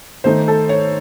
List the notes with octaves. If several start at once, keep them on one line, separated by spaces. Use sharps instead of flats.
D#3 A3 D#4 C5
A4
C#5